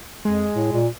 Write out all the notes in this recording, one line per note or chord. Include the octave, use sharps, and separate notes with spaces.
F2 G#3
A2
A#2